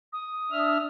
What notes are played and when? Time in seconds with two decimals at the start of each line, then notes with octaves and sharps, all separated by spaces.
0.13 D#6
0.51 D4 E5 F6